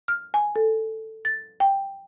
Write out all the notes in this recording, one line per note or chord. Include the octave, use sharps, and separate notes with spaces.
F6
G#5
A4
A6
G5